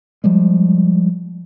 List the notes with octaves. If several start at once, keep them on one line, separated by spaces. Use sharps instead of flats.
F3 G3 G#3